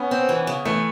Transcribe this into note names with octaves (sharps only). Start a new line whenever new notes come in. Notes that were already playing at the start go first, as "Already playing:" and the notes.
Already playing: B3 C#4
C4
E3
C#3
E3 A3